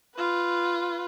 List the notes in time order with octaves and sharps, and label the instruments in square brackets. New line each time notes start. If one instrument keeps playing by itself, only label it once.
[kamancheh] F4 B4